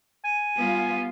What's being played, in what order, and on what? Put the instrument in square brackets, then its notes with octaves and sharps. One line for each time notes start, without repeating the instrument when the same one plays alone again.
[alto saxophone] G#5
[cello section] G3 B3 F4